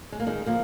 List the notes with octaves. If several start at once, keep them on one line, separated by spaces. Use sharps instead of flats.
G#3
A#3
D#3 G#3
F3 A#3